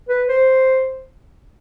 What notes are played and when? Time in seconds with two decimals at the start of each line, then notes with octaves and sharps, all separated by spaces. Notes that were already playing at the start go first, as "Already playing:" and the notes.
0.09 B4
0.29 C5